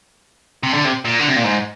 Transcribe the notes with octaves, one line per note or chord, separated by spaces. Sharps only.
C3
D3
C3
A#2
D3
C3
A#2
G#2